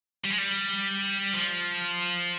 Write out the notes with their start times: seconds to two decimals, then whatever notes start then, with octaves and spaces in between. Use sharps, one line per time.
0.25 G3
0.31 G#3
0.39 G3
1.34 F3